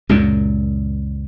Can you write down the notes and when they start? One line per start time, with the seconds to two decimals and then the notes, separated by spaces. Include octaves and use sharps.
0.09 C#2 F#2 A#2